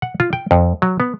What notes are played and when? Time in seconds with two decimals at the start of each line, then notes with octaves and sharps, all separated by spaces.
0.02 F#5
0.20 F4
0.33 G5
0.51 F2
0.82 F#3
1.00 B3